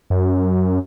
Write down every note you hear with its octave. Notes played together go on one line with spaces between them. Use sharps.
F#2